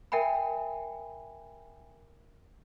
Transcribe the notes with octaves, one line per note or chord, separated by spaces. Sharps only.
A#4 E5 G5 G#5 B5